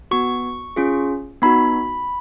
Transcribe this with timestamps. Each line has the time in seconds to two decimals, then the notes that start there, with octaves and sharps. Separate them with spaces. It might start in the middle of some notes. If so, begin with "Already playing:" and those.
0.11 B3 F#4 C#6
0.76 C#4 F4 G#4
1.42 B3 D#4 F#4 B5